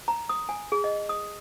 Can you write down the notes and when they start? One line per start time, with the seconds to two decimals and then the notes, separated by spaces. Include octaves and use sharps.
0.08 A#5
0.29 D#6
0.49 G#5
0.72 G#4
0.84 D#5
1.09 D#6